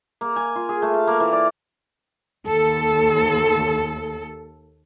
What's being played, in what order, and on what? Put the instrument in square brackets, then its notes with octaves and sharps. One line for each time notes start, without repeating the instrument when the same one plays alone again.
[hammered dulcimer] A#3
G#5
F4
G#4
A3
F5
A#3
E3
D5
[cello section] D#2 A4